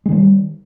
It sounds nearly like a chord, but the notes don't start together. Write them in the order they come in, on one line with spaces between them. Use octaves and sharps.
G#3 D#3 G3